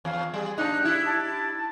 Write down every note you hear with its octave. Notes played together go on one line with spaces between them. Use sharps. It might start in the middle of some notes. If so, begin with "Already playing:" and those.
E2 F5
G3 G#4
A#2 D4 D#4 F#6
E4 G4
A5